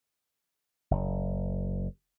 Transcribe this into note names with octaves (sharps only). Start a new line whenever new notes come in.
F#1